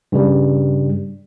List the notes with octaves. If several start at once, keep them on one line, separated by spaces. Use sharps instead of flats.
G2 C#3 G3